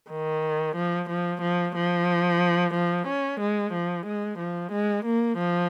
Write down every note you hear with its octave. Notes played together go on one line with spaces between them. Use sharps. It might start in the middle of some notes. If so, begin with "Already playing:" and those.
D#3
F3
F3
F3
F3
F3
C#4
G#3
F3
G#3
F3
G#3
A#3
F3